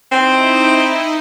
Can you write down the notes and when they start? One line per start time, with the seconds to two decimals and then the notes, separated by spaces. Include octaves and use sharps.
0.12 C4 D#4 E4 D#5